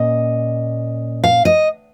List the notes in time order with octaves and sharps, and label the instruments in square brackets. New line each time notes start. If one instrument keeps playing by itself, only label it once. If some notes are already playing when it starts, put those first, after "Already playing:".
Already playing: [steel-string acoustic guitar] A#2 C#4 D#5
F5
D#5